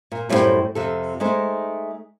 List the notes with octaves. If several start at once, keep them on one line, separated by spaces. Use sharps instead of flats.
A#2
F#2 A2 G3 E4 C5 G5
F2 C3 A4
G#3 A3 D#4 C5